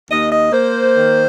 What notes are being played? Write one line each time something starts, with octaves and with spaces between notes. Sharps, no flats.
D#2 D#5
D#5
A#3 C5
D#3